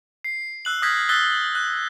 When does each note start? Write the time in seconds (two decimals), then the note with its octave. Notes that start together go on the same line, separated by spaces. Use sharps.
0.24 C7
0.65 E6 F#6 F#7
0.82 D#6 F6 G6 G#6 A#6 B6
1.09 D#6 E6 F#6 A6 B6 G7
1.55 F#6